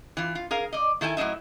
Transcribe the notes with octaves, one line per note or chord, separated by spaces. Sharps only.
E3 F4
F4
G#4 A#4 F5
D5 D#5
D#3 E4 A4 E5 G#5
A2 F#3 E4 D#5 E5